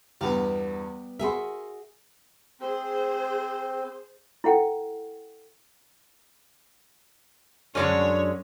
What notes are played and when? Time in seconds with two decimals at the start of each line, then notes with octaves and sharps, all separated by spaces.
0.21 E2 G2 G3 B3 E4 F5
1.19 F#4 G#4 A#4 E5 C6
2.60 C4 G#4 C5
4.44 E4 A4 F#5 G5
7.75 F#2 D3 G#3 C#4 D4 C#5 D5